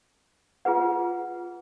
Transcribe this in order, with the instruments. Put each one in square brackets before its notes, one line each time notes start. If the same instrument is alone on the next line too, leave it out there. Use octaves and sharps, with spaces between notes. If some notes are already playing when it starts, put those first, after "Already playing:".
[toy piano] F4 G#4 B4 F#5